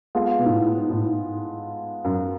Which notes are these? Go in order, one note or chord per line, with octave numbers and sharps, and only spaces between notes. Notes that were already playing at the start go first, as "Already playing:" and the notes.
G#3 B3 F4 A4 F5
B2
A2
G#2
A2
G#2
F#2